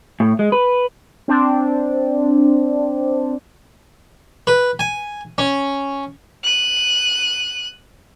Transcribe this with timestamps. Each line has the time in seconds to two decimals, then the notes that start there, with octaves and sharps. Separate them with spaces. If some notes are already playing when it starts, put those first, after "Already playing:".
0.20 A2
0.39 G#3
0.52 B4
1.28 C4 D4
4.47 B4
4.79 G#5
5.38 C#4
6.43 F#6 D#7